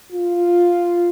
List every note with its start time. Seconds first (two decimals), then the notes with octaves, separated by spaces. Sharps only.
0.12 F4